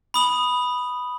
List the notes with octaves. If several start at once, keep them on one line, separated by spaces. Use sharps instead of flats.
B5 D#6 F#7